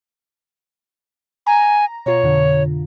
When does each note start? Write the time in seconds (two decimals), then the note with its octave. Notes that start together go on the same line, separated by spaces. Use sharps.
1.47 G#5 A#5
2.06 B2 F4 C#5
2.23 F2 D3